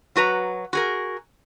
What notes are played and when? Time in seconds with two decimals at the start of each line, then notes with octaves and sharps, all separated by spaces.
0.16 F#3 F#4 B4 A#5
0.73 F#4 G#4 A#4